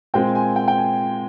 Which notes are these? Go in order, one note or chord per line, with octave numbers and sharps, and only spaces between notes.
A#2 G#3 C4 G5
G#5
G5
G5
G#5